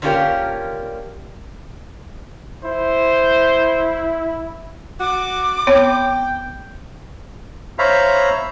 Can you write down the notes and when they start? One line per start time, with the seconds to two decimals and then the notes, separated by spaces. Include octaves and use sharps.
0.02 D3 A#3 C#4 F4 G4 A#4
2.65 E4 C5
5.00 F#4 D6
5.67 B3 C4 C#5 G5
7.79 C5 C#5 E5 F5 A#5 B5